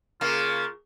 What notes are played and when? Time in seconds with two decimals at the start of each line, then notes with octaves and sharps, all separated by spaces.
0.21 C#3 A#3 F4